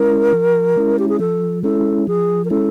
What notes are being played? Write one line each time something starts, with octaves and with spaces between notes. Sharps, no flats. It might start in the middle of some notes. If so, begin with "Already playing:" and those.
Already playing: G#3 C#4 E4 A#4
F3
G#3 C#4 E4
G4
G#4
F3 A4
G#3 C#4 E4 A4
F3 G#4
A#4
G#3 C#4 E4 A4